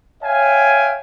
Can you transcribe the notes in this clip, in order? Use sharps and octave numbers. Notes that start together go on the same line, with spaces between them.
C#5 E5 F5 G5 G#5